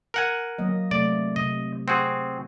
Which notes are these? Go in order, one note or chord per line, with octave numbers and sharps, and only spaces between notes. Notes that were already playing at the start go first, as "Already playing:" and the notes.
A#4 F#5 G#5
F#3 A#3 D#5
C3 A3 D5
C3 D#5
C4 F#4 G#4